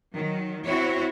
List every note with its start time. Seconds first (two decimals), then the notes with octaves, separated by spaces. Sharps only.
0.15 D#3 F#3
0.65 C4 E4 F#4 C#5